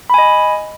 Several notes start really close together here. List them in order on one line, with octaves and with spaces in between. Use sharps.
B5 G#5 D#5